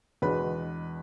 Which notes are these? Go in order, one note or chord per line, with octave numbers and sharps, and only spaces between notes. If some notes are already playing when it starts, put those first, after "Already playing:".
E2 B2 G#3 D4 B4